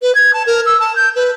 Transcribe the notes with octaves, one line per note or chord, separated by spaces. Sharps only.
B4
G#6
A5
A#4
E6
A5
G6
B4